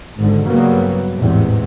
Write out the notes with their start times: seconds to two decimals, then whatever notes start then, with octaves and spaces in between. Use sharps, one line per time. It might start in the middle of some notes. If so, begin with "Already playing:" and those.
0.18 G#1 G#2 D3
0.47 G2 C#3 F#3 G3 A#3 B3
1.18 A1 E2 G#2 C3